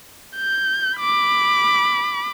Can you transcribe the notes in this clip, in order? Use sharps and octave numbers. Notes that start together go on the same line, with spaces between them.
G6
B5 D6